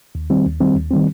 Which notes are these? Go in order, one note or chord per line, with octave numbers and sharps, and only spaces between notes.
D#2
D#3 G3 C4
D#2
D#3 G3 C4
D#2
D#3 G3 C4